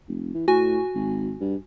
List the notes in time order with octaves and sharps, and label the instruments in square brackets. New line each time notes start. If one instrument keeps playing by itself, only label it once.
[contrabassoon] F1
E3
[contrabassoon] A2 [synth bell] F#4 G#5
[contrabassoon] G#1
G2